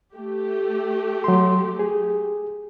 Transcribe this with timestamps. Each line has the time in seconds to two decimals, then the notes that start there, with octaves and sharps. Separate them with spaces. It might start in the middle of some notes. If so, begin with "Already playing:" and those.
0.14 A3 G4
1.24 F#3 C6
1.79 G#4